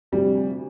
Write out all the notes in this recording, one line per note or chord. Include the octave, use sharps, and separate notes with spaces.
D2 C3 F3 G3